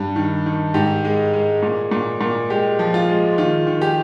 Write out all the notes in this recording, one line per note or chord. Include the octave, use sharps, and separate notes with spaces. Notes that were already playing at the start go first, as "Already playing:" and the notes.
Already playing: G2 G3
D#3
D#3
G#2 G4
G#3
G#3
A#2
A#2
A#2
G#3 G4
F3
F4
G#3
D#3 F4
D#3
G4